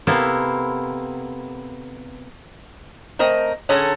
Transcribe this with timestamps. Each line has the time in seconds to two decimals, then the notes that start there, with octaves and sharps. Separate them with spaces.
0.07 C3 A#3 B3 E4 A4 C5
3.19 A3 C4 A#4 D#5
3.69 D3 C#4 G#4 A4 A#5